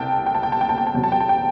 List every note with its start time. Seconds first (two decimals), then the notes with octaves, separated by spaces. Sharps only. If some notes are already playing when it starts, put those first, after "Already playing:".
Already playing: C2 G5 A5
0.26 G5
0.34 A5
0.43 G5
0.52 A5
0.61 G5
0.69 A5
0.78 G5
0.87 A5
0.94 E2 C3 F#3 G5
1.03 A5
1.12 G5
1.20 A5
1.29 G5